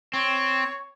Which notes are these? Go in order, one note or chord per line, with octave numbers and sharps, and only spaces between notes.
C4 C#5